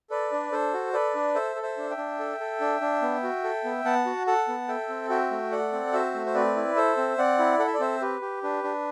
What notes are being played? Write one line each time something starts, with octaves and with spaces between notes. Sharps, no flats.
A4 B4 D5
D4
D4 A4 C5
F#4
A4 B4 D5
D4
A4 C5 E5
A4
C5 E5
D4
E5 G5
D4
A4
A4
D4
D4
B3
F#4
A4
B3
B3 F#5 A5
F#4
A4 F#5 A5
B3
A4 E5 G5
C4
F#4 E5 G5
A3
A4 D5 F#5
C4
F#4 C5 E5
A3
C5
C4 B4 D5
E4
A4 C5 E5
C4
C4 D5 F#5
E4
A4 F#5
E5
D5
C4 C5 E5
G4 B4
G4
D4 B4
D4